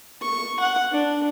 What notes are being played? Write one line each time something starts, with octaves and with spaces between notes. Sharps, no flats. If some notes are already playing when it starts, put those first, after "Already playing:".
C#6
F#5
D4